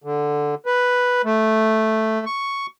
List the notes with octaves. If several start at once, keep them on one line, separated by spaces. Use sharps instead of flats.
D3
B4
A3
C#6